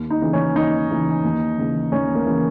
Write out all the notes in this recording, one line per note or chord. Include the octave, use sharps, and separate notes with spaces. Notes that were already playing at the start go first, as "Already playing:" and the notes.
Already playing: D#2
D#4
C#3 E3
C#4
D#2 D#4
C#3 E3
D#2
C#3 E3
D#2 C#4
A#3
C#3 E3